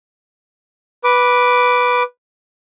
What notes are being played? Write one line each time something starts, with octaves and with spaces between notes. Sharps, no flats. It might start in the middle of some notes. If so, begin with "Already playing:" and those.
B4 D6